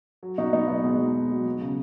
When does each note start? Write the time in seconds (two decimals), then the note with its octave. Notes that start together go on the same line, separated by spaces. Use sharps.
0.23 F#3
0.38 B2 D#4 F#4
0.53 B2 B3 D#4
0.68 F#3 B3 D#4
0.84 B2 G#3
1.00 F#3
1.14 B2
1.30 F#3
1.46 F#3
1.61 C#3